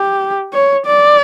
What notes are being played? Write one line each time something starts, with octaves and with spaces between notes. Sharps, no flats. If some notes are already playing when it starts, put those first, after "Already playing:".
Already playing: G4
C#5
D5